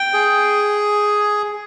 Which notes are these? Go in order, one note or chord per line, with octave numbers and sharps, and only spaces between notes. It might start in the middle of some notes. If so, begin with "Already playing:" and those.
Already playing: G5
G#4